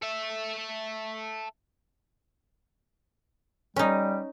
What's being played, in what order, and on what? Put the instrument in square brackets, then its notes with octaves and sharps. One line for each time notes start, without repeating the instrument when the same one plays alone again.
[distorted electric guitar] A4 E5
[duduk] G3 [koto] C#4 D#4